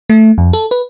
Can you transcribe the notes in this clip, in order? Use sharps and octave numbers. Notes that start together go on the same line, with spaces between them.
A3
F2
A4
B4